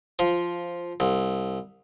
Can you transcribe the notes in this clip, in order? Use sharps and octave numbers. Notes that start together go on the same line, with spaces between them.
F3
C2